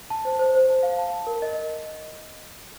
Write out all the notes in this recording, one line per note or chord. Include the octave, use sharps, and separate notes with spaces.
A5
C5
C5
C5
A5
F5
A5
A5
A#4
D#5